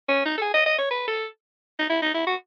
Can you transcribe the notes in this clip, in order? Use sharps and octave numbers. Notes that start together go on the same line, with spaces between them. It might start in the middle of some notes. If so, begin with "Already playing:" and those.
C#4
D#4
A4
G#4
D#5
D#5
C#5
B4
A4
D#4
E4
D#4
E4
F#4